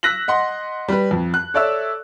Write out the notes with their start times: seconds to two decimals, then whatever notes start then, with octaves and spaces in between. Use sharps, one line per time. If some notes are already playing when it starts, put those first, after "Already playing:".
0.03 E6 F#6 A#6 B6 F#7
0.28 D#5 F#5 C6
0.88 G3 B4
1.11 F2
1.34 F#6
1.54 A4 C#5 D5 E5 E6